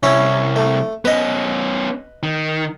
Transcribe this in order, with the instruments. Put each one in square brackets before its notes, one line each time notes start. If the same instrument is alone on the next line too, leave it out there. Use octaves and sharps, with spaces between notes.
[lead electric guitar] C2 [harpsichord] C#4 E4 C#5
[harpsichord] A3
[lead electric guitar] B3 C#4 [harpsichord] B4 D#5
[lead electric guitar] D#3